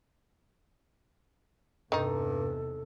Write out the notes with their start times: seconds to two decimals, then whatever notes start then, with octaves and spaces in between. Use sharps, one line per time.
1.92 E2 G2 C3 D#3 D#4 A4